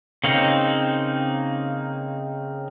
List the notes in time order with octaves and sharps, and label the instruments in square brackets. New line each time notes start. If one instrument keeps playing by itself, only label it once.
[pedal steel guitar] C#3 A#3 C4 D#4